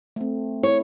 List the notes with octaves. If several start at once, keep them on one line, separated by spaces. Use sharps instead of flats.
A3 C4
E4 C#5